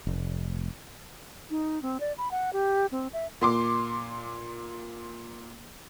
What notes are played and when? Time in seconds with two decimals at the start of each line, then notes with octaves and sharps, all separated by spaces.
0.07 F1
1.50 D#4
1.82 C4
2.00 D5
2.18 B5
2.31 F#5
2.53 G4
2.92 C4
3.13 E5
3.41 A#2 C6 D6